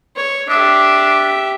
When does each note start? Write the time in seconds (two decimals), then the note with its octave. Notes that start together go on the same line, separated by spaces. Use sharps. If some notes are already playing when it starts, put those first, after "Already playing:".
0.16 C#5
0.49 D4 G4 E5